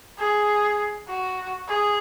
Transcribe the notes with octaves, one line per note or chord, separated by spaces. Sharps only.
G#4
F#4
G#4